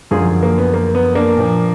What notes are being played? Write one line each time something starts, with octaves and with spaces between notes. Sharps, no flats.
F#2 D3 F3 F4 G#4
A#3
B3
A#3
B3
A#3 D4
A#2 F3